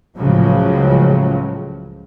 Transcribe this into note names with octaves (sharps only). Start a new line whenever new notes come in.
C#2 A2 C#3 F3 F#3